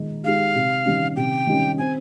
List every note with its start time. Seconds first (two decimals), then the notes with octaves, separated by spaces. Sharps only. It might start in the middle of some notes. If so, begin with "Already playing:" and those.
Already playing: D#3 G#3 D#4
0.24 G#3 D#4 G4 F5
0.55 C3
0.85 D#3 G3 C#4
1.16 C3 G5
1.47 D#3 G3 C#4
1.78 C4 G#5